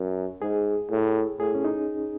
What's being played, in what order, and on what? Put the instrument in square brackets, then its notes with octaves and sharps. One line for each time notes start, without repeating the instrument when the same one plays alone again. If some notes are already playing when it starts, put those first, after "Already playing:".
Already playing: [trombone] F#2
[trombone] G#2 [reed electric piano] G#4
[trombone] A2
[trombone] A2 [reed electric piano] G#4
[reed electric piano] C#4
D#4